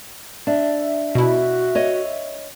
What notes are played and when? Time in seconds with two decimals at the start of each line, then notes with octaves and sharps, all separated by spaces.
0.47 D4 E5
1.15 B2 E4 F#4
1.75 C#5 D#5